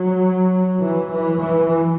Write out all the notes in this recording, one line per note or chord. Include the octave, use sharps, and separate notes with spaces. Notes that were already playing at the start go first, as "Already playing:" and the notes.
Already playing: F#3
E3
E3
E3